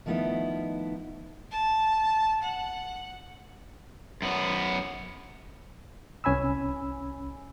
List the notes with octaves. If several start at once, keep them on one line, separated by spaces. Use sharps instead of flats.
D#3 F3 A3 B3 D#4 E4
A5
F#5
F#2 B3
C2 C#4 G#5 B5 E6